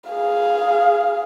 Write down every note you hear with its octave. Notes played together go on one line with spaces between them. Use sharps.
G#4 F5